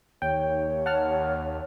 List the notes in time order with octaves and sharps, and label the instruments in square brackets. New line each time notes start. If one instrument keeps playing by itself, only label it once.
[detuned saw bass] D#2 [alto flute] C#5 [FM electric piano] G5
[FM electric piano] F#5 A5 F6